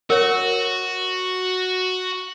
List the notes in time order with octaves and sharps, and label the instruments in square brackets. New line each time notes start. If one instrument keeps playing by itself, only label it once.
[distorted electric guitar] F#4 [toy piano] A#4 C#5